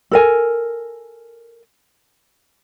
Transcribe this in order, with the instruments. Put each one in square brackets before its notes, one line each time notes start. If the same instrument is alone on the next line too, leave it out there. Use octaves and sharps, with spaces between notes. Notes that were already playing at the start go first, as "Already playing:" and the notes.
[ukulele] A4 A#4 G#5